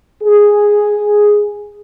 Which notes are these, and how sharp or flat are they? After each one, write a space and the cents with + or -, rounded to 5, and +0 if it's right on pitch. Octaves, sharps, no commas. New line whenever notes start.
G#4 +0